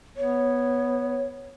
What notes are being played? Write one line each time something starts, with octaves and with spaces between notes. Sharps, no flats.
B3 C#5